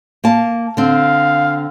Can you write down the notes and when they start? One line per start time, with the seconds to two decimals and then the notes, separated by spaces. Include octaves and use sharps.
0.24 A#3 A5
0.77 D3 C4 F5